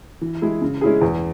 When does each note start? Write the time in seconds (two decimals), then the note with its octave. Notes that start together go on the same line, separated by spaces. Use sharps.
0.21 E3
0.42 G#3 E4 G#4
0.62 C#3
0.81 G#3 C#4 E4 G#4
1.02 E2